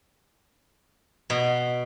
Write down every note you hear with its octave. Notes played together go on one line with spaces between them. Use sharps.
B2